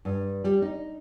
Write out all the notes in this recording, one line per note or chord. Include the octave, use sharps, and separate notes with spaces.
G2
G3
D#4